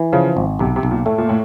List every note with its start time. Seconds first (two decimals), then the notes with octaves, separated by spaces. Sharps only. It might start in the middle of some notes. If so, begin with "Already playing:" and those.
Already playing: E3
0.13 C#3 F3
0.37 G#1
0.59 B1 C3
0.76 C3
0.83 B1
0.91 A#2
1.06 A2 A3
1.18 A#2
1.29 A2